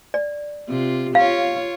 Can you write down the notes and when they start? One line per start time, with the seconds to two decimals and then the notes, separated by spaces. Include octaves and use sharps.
0.14 D5
0.68 C3 F4
1.15 F4 C#5 F5